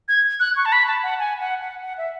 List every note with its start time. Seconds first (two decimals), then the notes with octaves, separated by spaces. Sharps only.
0.09 G#6
0.40 F#6
0.56 C#6
0.65 A5
0.72 B5
0.87 A5
1.03 F#5
1.19 G#5
1.40 F#5
1.61 F#5
1.82 F#5
1.98 E5